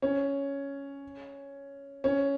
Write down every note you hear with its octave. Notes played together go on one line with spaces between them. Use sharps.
C#4
C#4